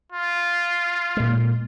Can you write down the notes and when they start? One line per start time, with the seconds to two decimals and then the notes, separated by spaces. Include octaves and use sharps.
0.12 F4
1.17 A#2 G#3